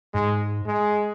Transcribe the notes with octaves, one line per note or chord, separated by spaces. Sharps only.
G#2 G#3
G#3